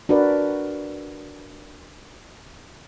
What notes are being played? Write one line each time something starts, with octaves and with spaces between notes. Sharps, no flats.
D4 F#4 A#4 B4 D5